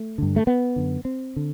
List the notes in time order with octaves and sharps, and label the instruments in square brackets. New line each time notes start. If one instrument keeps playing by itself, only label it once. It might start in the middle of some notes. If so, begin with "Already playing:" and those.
Already playing: [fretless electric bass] A3
G2 D3
A3
B3
F#2 D3
C4
D3